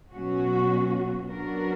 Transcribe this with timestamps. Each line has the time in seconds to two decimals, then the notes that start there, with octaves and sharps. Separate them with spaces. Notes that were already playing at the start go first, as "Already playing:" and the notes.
0.13 B2 F#3 C#4 F#4
1.29 F#3 B3 D4 F#4 A#4